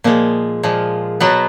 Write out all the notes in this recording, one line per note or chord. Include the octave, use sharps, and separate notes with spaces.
A#2 F3 G#3 A#3
A#2 F3 G#3
B2 F#3 B3 F#4